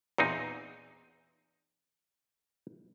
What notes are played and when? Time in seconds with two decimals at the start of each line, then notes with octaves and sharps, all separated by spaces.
0.18 E2 A#2 C4 D#4